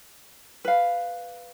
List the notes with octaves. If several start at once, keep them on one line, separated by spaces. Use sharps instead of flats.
B4 F5